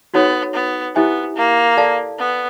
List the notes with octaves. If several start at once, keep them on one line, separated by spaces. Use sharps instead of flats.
B3 D#4 F#4 A4 C#5 F#5
B3
B3 E4 G4 C5 E5 G#5
A#3
A4 D5 F5 A5
B3